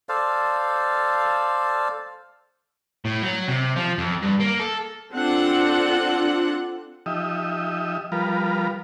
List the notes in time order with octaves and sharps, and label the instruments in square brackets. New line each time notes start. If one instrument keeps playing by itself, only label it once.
[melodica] A4 C5 D5 F5
[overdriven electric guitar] A2
F#3
C3
F3
F2
G2
A#3
A4
[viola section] C4 D4 F4 A4 F#5
[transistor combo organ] F3 D#4 G4 D#5 E5
F3 G3 F4 A#4 B4